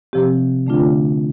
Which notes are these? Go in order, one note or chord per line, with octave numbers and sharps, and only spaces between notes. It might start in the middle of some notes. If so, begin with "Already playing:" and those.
C3 F3 C4 G4
D3 A3 D4 F4